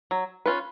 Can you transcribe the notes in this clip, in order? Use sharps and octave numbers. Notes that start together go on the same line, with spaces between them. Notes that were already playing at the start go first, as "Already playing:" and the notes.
F#3
C#4 F4 B4